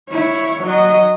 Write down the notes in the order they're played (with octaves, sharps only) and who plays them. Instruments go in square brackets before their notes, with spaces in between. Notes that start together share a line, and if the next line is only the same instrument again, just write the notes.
[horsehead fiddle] E4 C#5
F#3 D#5